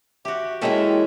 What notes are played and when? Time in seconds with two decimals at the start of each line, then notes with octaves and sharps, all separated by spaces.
0.25 F#4 G4 E5
0.61 E3 G#3 A#3 C#4 A4 E5 G5